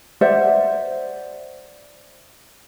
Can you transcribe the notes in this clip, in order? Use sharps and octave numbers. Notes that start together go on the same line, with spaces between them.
C5 D5 E5 F#5